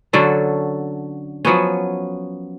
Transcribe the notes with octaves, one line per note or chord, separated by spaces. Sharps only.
D3 F#3 C#4 A4
F3 F#3 B3 C#4